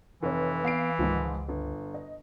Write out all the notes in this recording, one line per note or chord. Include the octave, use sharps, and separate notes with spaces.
F1 E3 C#5
B3 F5 C7 D7
C#2 G#2 D#3 F3
G1
D#5